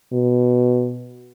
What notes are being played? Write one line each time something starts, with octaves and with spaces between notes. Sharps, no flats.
B2